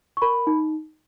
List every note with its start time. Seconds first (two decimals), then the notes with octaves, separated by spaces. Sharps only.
0.17 C#6
0.22 A#4 B5
0.47 D#4